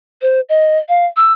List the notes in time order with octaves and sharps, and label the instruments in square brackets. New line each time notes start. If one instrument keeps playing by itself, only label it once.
[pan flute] C5
D#5
F5
E6